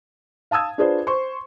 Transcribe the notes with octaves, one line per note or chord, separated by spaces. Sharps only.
F5 A5 D#6 E6 G#6
D4 F4 G#4 B4 C5 D5
C5 C6 C#6